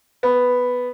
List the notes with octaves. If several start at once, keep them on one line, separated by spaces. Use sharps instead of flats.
B3